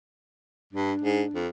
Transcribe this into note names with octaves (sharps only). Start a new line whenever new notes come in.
G2 D4
G#2
F2